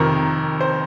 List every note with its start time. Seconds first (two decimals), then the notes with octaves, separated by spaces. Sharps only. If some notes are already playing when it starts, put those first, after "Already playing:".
Already playing: F2 C3 D#3 A#4
0.61 C5